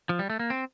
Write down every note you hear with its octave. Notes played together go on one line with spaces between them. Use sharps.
F3
G3
A3
A#3
C4